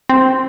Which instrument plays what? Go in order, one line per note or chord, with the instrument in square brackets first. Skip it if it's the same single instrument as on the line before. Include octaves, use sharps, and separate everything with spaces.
[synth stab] C4